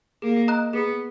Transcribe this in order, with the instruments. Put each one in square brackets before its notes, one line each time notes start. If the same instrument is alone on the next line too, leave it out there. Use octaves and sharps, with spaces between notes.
[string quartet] A#3 [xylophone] G#4
[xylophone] D#5 A#5 D#6 F#6
[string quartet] B3 [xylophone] G#4